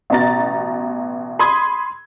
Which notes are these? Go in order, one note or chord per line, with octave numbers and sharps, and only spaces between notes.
A1 B2 A#5 A6
B5 C6 D#6 G#6